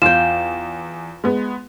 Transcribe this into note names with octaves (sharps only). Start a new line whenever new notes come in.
E2 F4 G5 E7
G#3 B3